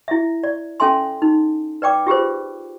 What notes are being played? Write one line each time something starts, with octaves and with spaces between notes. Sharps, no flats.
E4 E5
D5
C#4 A4 E5 G#5 C6
D#4
B4 D5 G5 D6
F4 G4 G#4 B4 C5